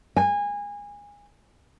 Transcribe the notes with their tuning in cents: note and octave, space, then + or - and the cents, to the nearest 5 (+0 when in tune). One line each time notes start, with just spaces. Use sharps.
G#5 -25